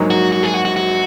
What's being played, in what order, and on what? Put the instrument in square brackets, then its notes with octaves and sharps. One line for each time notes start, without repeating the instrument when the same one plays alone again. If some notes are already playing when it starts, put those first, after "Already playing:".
Already playing: [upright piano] A#1 G#2 F#3 A#3 D#4
[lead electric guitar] F#4
F#4
G#4
F#4
F#4
F#4